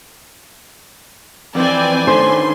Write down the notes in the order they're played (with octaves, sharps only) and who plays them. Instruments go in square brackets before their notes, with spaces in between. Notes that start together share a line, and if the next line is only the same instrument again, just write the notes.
[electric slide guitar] F2 E3 [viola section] C4 D5 G5 [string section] B4 G#5
[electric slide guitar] D#3 C#4 D4 [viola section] A3 C6 [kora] C5